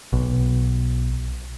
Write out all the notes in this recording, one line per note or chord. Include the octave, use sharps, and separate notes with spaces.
B1